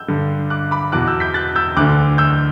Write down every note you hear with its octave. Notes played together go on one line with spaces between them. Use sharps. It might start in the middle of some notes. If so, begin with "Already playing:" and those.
Already playing: E6 G6
G2 D3
D6 F#6
B5 D6
E2 B2 D6 F#6
E6 G6
G6 B6
F#6 A6
E6 G6
D2 D3 D6 F#6
E6 G6